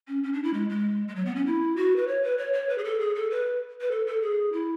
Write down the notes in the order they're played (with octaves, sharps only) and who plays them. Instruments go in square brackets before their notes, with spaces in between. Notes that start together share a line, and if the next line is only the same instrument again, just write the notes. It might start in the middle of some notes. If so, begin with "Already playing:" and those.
[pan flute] C#4
C#4
D4
E4
G#3
G#3
G#3
F#3
B3
C#4
E4
F#4
B4
C#5
B4
C#5
C#5
B4
G#4
A4
G#4
A4
B4
B4
A4
A4
G#4
E4